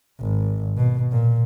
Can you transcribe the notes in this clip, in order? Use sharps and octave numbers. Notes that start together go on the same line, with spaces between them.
G#1
B2
A#2